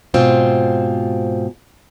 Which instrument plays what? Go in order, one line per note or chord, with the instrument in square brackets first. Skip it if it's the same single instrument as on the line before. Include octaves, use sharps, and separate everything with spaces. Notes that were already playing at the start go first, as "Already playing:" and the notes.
[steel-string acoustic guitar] G#2 B2 C4 F4